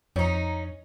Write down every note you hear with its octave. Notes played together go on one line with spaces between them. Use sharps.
F2 C#4 D#4